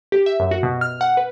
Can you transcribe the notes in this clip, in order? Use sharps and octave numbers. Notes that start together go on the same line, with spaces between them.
G4
E5
F#2
F#4
B2
F6
F#5
B4